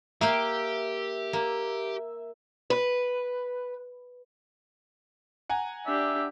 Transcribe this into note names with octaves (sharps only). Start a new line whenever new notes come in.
A#3 G4 E5 F5 G5
A#3
B4
F#5 G#5 A#5
D4 G4 E5